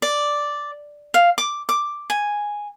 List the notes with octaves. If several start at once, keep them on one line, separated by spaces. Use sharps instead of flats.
D5
F5
D6
D6
G#5